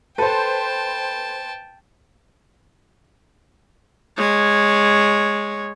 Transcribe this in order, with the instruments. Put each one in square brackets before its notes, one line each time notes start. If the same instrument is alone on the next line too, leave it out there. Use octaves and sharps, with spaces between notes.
[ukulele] A4 [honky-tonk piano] B4 C5 [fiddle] G5 A5
[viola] G#3 C#5